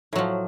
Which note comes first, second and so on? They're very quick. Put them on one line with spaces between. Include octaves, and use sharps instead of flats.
A2 F#3 F3